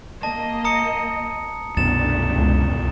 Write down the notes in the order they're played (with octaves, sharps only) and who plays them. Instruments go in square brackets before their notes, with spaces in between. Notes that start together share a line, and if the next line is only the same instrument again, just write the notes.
[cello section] A#3 D#5 [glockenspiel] A5
[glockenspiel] A#5 D#6 C#7
[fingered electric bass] C2 F#2 B2 [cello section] A3 D4 [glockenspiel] A6 E7
[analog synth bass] C#2